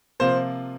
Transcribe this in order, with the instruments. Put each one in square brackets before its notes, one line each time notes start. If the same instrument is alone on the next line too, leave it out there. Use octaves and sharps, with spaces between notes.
[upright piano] C3 F3 A#3 F4 [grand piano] C5